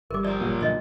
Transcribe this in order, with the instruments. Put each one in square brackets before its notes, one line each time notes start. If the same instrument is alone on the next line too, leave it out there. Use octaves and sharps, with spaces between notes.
[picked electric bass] G1 G3 [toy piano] A#4 D6
[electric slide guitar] F3 A#4 [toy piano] D5
[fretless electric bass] A#2 F#3
[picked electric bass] B1 G2 D3 [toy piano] C#5 D#5